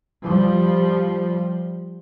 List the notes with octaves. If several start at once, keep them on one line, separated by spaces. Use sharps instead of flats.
F3 G3